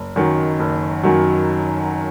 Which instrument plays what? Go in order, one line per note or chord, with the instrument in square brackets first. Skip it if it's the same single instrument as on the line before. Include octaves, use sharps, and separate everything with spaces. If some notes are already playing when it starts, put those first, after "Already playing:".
Already playing: [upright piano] F#1
F#2 D#3 F#3
F#1
F#2 D#3 F#3